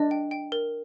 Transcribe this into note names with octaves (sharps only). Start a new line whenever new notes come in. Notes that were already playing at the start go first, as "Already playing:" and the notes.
Already playing: D4 D#5
G5
G5
A#4